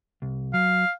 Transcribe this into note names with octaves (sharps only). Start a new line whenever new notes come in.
C2
F#3 F5